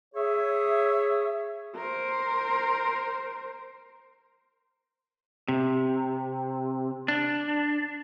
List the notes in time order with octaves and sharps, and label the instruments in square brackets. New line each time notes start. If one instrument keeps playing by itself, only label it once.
[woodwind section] G#4 C#5 E5
[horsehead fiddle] A#4 C5
[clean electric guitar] C3
D4